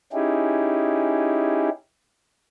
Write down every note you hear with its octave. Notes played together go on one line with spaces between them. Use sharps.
C#4 D#4 E4 G4 G#4